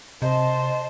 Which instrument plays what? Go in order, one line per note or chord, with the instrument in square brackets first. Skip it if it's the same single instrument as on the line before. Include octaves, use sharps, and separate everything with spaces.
[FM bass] C3 [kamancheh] C5 A5 [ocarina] D#5